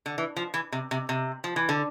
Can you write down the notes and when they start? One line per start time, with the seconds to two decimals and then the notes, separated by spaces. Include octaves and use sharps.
0.06 D3
0.18 E3
0.36 F3
0.54 E3
0.72 C3
0.91 C3
1.09 C3
1.44 F3
1.56 E3
1.69 D3